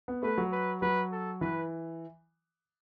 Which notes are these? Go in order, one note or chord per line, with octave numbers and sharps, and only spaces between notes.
B3
A3 B4
F#3
B4
F#3 B4
A4
E3 B4